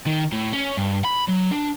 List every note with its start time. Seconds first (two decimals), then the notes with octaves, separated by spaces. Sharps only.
0.07 D#3
0.33 A2
0.53 C#4
0.77 G2
1.04 B5
1.28 F#3
1.51 D4